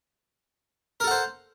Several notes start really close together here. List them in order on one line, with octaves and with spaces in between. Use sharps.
A#4 A4 F#5 C5